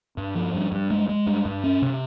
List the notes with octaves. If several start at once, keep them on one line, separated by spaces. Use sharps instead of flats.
G2
F3
G2
G2
G#3
G#3
G2
G2
C#4
C3